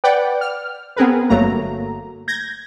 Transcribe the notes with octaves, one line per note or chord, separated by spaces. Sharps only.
B4 D5 F#5 G5
F6
B3 C4 G#4 A#4 B4
G1 F#3 A3 A#3 A#5
G6 G#6 A#6